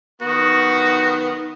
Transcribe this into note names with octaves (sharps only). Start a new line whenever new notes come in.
D#3 B3 F#4